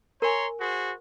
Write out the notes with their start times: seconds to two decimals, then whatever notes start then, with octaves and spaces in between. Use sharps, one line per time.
0.22 A#4 C#5 G#5 A#5 C6
0.60 F#4 G#4 C5